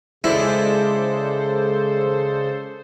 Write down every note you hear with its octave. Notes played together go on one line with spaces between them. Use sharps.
C#3 G#3 E4 A4 C5 D5